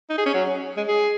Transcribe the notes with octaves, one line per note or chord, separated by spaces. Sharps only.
D#4
G#4
C#4
F#3
G#3
G#4